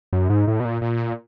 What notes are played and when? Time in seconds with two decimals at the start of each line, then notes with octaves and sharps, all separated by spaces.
0.13 F#2
0.30 G#2
0.48 A2
0.60 B2
0.65 A#2
0.82 A#2